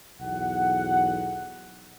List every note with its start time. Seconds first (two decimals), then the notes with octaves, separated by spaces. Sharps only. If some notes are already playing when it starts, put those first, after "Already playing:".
0.21 B1 E2 F#5